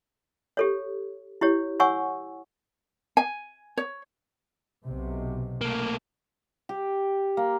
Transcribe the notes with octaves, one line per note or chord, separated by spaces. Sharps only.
G4 A4 C#5
E4 G4 C#5
C#5 F#5 G#5 C#6 E6
G#5
C#5
B1 C3
A3 A#3
G4
A#3